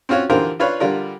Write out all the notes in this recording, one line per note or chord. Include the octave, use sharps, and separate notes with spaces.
C4 C#4 F4 F#4 C#5
D3 E3 F4 G4 A#4 C5
D4 F4 B4 C#5 F5
D3 G3 F4 A#4